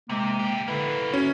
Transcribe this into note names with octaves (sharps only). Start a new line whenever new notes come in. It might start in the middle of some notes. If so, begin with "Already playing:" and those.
C3 G#3 A#3
A#2 G4
D3 A#3 E4 B4
C#4 F#4